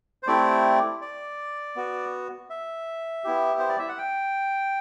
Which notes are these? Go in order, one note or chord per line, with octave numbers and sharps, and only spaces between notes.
C5
A3 C4 E4 G4 D5
D5
B3 F#4
E5
B3 E4 G4
C5
D5
E5
F#5
G5